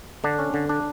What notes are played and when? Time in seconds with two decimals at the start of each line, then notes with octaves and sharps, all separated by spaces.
0.24 D3 D4
0.39 C#4
0.54 D3
0.69 D4